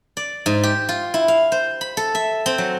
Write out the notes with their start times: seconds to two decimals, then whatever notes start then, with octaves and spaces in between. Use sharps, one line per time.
0.17 D5
0.46 G#2
0.63 G4
0.89 F4
1.14 E4
1.28 F5
1.52 C5
1.81 B5
1.97 A4
2.15 E5
2.46 C4
2.58 F#3